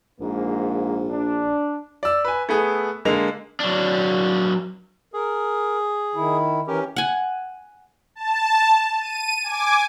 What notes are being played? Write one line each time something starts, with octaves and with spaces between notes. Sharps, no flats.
A#1 G#2 A#3
D4
D5 E6
B4 G#5
A3 B3 G#4
D3 G#3 A#3 F7
F#3 D4
G#4 A#4
D#3 E4
E3 C#4 G4 A#4
F#5 G#5
A5
D#7
G#5 D6